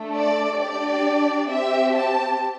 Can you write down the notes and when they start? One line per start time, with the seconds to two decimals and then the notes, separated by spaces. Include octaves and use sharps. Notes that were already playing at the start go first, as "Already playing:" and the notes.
Already playing: A3 D4 A4
0.14 D5
0.59 D4 G4 D5
1.50 C4 G4 E5
1.95 A5